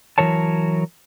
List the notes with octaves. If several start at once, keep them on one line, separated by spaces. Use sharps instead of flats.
E3 F#3 A#4 C#5 A5